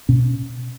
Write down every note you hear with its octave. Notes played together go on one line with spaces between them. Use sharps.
B2 C#4